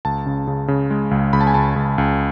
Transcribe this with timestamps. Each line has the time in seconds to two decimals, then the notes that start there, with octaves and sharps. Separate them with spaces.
0.05 C#2 A5
0.26 C#3
0.47 C#3
0.68 C#3
0.90 G#3
1.11 C#2
1.33 C#2 B5
1.41 A5
1.47 G#5
1.54 C#2 A5
1.76 C#2
1.98 C#2